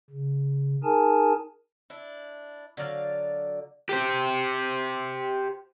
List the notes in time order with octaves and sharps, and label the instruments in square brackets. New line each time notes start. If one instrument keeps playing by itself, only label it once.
[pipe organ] C#3
D#4 G#4 A#4 G#5 A5
[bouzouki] D4 E4
D3 F#3 D5 F5
[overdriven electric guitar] G4 C5